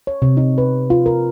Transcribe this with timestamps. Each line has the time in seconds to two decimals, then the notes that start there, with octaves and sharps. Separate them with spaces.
0.07 C#5
0.22 C3
0.37 D#4
0.58 B4
0.90 F4
1.06 A#4